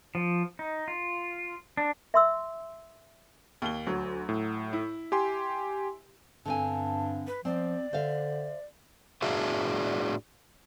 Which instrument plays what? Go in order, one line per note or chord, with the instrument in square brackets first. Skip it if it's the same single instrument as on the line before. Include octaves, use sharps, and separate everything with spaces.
[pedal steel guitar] F3
D#4
F4
D4
[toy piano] E5 C6 E6
[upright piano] D#2 G7
[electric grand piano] D2 [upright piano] F#3
[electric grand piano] A2
[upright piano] E4
[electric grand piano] G4 G#5 C6
[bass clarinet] G2 [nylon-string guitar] D3 C4 G#5 [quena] A5
[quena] B4
[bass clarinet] F3 [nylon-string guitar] C4 [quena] D5
[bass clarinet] D3 [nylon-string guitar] C5 E5 F5
[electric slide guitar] A2 D4 F#4 G#4 D5 E5